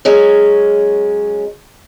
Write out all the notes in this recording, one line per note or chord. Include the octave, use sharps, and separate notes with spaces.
F#3 G#3 C#4